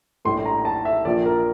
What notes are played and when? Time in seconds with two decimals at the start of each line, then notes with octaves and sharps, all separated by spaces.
0.25 A#1 A2 G3 C6
0.46 A#5
0.65 A5
0.85 E5
1.05 A#1 A#2 F3 D5
1.25 A#4